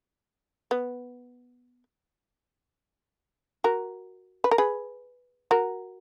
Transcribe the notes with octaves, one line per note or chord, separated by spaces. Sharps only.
B3
F#4 A#4
B4
A#4
G#4 B4
F#4 A#4